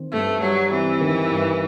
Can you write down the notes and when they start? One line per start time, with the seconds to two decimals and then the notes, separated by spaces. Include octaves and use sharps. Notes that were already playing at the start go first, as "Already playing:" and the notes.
Already playing: D#3 C4
0.12 G2 A3
0.41 F#3 G3
0.71 E3 C4
1.01 D#3
1.30 G2